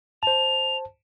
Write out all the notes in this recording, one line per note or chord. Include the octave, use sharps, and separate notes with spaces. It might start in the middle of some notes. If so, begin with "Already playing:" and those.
C5 A5 F7